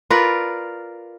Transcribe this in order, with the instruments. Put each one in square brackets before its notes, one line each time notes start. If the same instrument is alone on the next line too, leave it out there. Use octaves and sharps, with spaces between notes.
[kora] F4 A#4 B4 D5